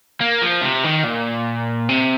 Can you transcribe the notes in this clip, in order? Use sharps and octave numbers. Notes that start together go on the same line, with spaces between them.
A#3
F3
C3
D#3
A#2
C3